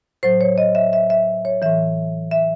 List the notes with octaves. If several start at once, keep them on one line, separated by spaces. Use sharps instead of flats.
A2 F#3 C5
C#5
D#5
E5
E5
E5
C#5
A2 E3 E5
E5